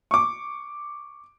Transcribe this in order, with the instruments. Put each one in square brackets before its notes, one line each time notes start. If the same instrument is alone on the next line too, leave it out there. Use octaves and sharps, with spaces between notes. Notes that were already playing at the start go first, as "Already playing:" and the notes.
[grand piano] C#6 D6